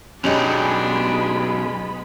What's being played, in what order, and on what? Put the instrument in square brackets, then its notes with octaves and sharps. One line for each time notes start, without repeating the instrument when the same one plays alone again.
[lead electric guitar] B1 [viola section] G#3 B3 B5 [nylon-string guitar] C#4 G4 D#5 [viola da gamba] D4